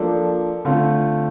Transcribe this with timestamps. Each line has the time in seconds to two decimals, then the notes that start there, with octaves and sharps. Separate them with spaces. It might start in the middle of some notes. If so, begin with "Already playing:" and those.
Already playing: F3 A#3 D4 A4
0.65 D3 A3 C4 F4